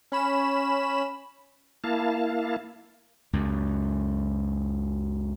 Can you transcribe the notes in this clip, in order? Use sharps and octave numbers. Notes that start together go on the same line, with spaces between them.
C#4 B5 E7
A#3 E4 F5 A5
C#2 F#2